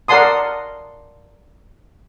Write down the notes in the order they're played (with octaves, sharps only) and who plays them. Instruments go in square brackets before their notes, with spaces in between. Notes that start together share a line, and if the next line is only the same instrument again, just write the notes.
[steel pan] A#4 D5 F#5 A5 C6 D#6